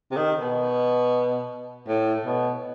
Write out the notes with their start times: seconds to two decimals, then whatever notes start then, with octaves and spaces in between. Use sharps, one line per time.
0.11 C3
0.16 D#3
0.41 B2
1.88 A2
2.25 B2